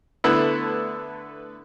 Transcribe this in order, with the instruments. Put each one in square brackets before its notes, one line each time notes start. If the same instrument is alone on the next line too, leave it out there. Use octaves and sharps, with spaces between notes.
[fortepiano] D3 B3 E4 [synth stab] A3 A4 B4